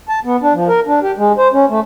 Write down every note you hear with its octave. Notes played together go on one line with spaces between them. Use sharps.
A5
B3
D4
F3
A#4
D4
G4
G#3
C5
C#4
A3